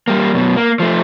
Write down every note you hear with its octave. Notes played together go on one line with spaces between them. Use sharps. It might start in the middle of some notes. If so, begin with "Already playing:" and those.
G3 A#3
F#2 B2
A#3
F3 A3